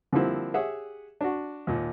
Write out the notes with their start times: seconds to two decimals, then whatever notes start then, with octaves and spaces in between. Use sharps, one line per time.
0.13 D3 F3 G3 A#3 C4 E4
0.54 G4 G#4 C#5 E5 F#5
1.21 D4 F#4
1.67 D#2 A#2